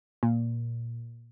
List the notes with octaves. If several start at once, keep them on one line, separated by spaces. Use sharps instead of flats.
A#2